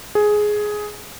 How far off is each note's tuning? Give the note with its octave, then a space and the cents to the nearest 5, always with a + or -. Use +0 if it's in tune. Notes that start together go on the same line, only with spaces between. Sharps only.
G#4 +10